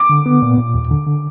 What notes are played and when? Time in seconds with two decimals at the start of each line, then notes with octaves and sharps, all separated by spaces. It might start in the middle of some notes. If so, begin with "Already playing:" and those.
Already playing: D6
0.09 D3
0.26 B3
0.42 A#2
0.58 A#2
0.74 D#2
0.91 D3
1.07 D3